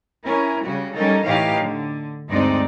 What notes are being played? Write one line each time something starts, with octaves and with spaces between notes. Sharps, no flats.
C#4 E4 A#4
C#3 G3 F#4
G3 C#4 D#4 A4 A#4
A2 E3 D#4 G4 C#5 F5
D3
D2 G2 G#3 C4 D#4 D5